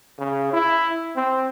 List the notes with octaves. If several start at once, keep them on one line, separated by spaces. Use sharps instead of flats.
C#3
E4
C4